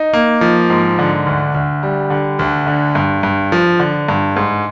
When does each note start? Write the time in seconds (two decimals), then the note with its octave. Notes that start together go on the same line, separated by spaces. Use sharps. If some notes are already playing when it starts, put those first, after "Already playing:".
Already playing: D#4
0.13 A#3
0.41 F3
0.70 G#2
0.99 D3
1.26 D2
1.54 D2
1.83 G3
2.10 D3
2.39 D2
2.67 D3
2.95 G2
3.23 G2
3.52 F3
3.80 D3
4.09 G2
4.36 G#2